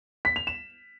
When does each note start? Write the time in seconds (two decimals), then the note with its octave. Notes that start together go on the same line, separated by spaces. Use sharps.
0.25 B6
0.36 F7
0.47 E7